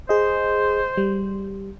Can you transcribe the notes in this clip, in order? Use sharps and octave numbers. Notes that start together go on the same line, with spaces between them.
G#4 C5 D#5
G3